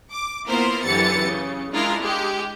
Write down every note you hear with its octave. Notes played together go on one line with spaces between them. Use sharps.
D6
A#3 B3 E4 F4 A#4 C5
F#2 D3 E3 G4 A6 C#7
C#3
G#3 D4 E4 F4 A#4
G#3 G4